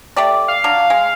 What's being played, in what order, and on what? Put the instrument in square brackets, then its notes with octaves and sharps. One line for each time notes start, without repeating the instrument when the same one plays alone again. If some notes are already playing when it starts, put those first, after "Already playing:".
[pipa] A3 G4 D5
[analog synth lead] F5
[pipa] F#3 D4
G#3